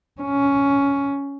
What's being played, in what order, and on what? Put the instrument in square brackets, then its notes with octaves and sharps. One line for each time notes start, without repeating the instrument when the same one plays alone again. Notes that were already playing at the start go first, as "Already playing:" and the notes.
[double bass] C#4